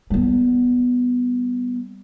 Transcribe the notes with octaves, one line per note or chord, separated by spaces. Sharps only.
G3 B3